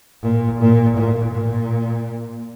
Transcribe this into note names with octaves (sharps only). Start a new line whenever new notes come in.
A#2
A#2
A#2
A#2